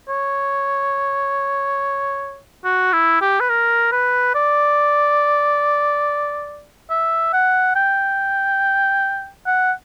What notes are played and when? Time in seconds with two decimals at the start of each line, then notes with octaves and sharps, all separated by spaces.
0.09 C#5
2.64 F#4
2.92 E4
3.21 G4
3.40 B4
3.49 A#4
3.92 B4
4.35 D5
6.90 E5
7.33 F#5
7.75 G5
9.46 F#5